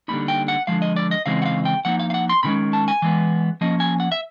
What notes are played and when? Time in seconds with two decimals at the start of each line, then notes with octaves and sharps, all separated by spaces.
0.08 D3 G3 A#3 D#4 B5
0.28 G5
0.48 F#5
0.67 D3 F3 G#3 F5
0.82 D#5
0.96 D5
1.11 D#5
1.26 C#3 E3 G#3 C4 D#4 F5
1.42 F#5
1.46 F5
1.65 G5
1.85 F3 A#3 D#4 F#5
2.00 F5
2.10 F5
2.14 F#5
2.29 C6
2.43 C3 D#3 G#3 C#4 B5
2.73 A5
2.88 G#5
3.02 E3 G#3 B3
3.61 F3 A#3 C#4 D#5
3.80 G#5
4.00 F#5
4.12 E5